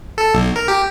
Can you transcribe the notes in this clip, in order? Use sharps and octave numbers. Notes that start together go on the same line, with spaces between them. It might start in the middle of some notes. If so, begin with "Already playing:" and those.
A4
B1
A#4
G4